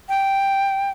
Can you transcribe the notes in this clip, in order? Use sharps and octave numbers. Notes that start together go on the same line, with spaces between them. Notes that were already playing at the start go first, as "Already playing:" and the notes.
G5